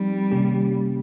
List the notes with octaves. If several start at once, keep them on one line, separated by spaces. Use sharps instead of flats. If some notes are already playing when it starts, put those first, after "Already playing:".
Already playing: F3 G3 C4 D#4
C3 D#3 A#3 C#4 G4